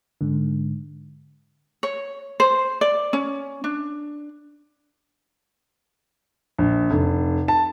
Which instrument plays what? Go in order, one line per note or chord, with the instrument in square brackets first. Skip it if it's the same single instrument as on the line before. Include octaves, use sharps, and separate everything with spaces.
[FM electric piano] G#2 D3
[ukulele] C#5
C5
D5
C#4
D4
[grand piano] A#1
F1
A5